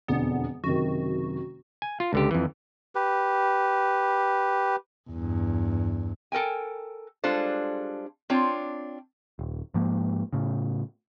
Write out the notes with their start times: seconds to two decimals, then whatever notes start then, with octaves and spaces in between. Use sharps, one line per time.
0.08 E1 F2 D3 B3
0.64 F#1 C3 D#3 F#4
1.82 G#5
2.00 F4
2.13 C#2 D3 G4
2.31 F2 E3
2.95 G4 B4
5.11 E2 G2
6.32 A4 A#4 G5 G#5
7.24 G3 G#3 D4 F4 A4 C5
8.30 C4 D4 F4 C#5
9.39 D#1
9.74 G#2 F3 A#3
10.33 A2 C#3